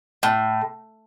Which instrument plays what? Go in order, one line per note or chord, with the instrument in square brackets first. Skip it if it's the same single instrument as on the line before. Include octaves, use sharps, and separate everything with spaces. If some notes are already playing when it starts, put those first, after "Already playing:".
[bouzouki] A2